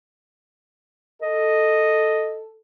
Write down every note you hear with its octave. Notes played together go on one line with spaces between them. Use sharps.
A4 D#5